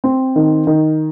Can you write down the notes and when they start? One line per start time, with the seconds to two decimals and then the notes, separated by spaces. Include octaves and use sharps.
0.04 C4
0.36 D#3
0.67 D#3